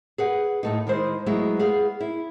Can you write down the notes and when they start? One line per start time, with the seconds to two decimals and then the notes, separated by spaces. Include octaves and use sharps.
0.18 G#4 B4 F#5
0.63 A2 A3 D#4
0.87 D#3 G#3 E4 C5
1.26 F#3 G#3 A3 B3 E4
1.59 B3 G#4 F5
2.00 E4